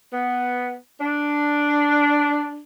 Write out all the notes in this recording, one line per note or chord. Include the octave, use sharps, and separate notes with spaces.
B3
D4